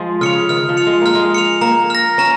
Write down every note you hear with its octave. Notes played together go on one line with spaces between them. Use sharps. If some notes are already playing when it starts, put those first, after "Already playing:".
Already playing: F3 G#3
C#3 F6 C#7 F7
D#3 F6
F3
C#7 F7
G#3
A#3 F6
G#3
C#7 F7
A#3 A#5
F6 A#6
C#4 A#5